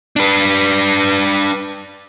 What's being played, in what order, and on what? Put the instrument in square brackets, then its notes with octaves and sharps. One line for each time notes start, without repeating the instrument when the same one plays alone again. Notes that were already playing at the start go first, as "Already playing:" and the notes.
[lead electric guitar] D4 B4